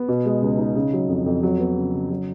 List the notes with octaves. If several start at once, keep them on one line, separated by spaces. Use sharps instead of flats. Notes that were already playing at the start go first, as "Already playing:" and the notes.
Already playing: B3
B2
G#3
C#2
D#4
C#3
F#3
F2
F2
F#3
B3
C#3
C#3
F#3